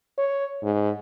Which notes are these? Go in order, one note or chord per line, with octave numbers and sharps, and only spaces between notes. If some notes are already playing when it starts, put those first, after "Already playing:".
C#5
G#2